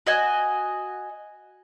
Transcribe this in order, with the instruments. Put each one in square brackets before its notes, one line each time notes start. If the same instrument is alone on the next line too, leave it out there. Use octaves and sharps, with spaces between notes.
[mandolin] F#4 D#5 G#5